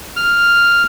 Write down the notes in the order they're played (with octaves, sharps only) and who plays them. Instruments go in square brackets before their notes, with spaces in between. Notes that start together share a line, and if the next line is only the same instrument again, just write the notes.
[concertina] F6